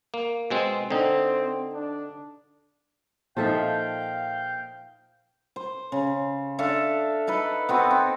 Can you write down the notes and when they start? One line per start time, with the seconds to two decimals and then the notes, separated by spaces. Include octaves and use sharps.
0.14 A#3
0.50 B2 G#3 C4
0.90 D3 C4 D#4
1.74 D4
3.37 A#2 F3 D#4 A4 E5 F5 G5 G6
5.56 C5
5.92 C#3
6.59 D4 A4 E5 F5
7.27 D#4 A4 B4
7.69 B3 C4 F#4
7.91 C4